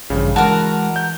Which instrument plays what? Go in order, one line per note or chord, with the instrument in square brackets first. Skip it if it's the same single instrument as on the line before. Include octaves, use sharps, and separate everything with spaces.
[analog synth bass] A1 [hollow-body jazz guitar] G2 F3 [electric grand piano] C#3
[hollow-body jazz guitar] E3 [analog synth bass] G#3 [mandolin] F#4 A#4 [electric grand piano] A5
[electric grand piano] G6